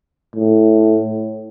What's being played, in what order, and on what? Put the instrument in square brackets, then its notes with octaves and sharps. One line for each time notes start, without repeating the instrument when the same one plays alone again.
[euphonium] A2